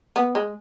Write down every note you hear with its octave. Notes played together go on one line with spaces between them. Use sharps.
B3
G#3